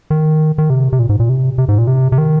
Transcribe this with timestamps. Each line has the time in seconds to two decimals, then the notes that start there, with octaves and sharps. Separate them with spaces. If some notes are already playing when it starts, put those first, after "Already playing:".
0.10 D#3
0.58 D#3
0.70 C3
0.92 C3
0.99 A#2
1.09 G#2
1.20 A#2
1.29 C3
1.58 C3
1.68 G#2
1.78 A#2
1.87 C3
2.12 C3
2.18 D#3